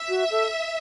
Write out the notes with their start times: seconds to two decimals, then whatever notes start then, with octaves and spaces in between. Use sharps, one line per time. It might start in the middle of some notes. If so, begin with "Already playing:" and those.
Already playing: E5
0.09 F#4
0.31 A4